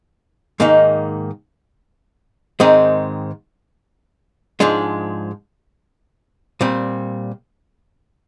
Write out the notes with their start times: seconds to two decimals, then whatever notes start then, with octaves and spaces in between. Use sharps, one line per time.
0.60 G#2 D#3 A#3 D#4
2.60 G#2 D#3 G#3 C4 D#4
4.60 G#2 F3 G#3 D4
6.61 A#2 G3 C4